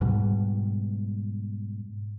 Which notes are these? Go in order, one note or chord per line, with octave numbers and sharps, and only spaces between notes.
G#2 B2 G3